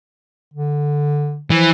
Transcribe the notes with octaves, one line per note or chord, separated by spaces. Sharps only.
D3
E3 F3